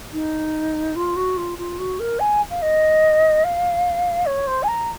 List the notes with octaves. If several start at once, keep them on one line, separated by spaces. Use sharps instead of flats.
D#4
F4
F#4
F4
F4
F#4
A#4
G#5
F5
D#5
F5
C#5
C5
G#5
A#5